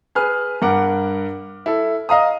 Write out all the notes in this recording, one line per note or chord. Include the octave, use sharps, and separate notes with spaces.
G#4 B4 F6
G2 A#4 F#5 D6
E4 A4
D#5 F5 A#5 D#6